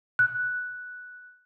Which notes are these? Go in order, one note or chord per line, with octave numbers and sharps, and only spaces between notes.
F#6